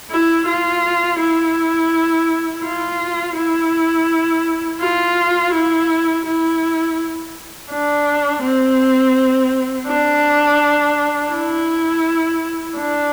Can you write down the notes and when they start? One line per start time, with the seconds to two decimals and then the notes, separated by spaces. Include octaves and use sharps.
0.11 E4
0.47 F4
1.20 E4
2.64 F4
3.36 E4
4.81 F4
5.54 E4
6.26 E4
7.70 D4
8.42 C4
9.87 D4
11.31 E4
12.76 D4